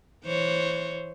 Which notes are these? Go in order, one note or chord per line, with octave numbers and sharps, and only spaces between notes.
E3 C5 C#5